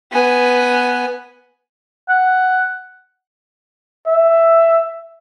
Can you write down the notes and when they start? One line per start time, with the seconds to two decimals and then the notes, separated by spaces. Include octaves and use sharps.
0.12 B3 G#5
2.09 F#5
4.07 E5